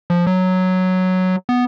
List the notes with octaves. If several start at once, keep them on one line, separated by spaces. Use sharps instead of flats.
F3
F#3
B3